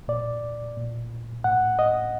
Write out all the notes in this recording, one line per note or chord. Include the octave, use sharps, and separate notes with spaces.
A#2 D5
A#2
A2 F#5
D#5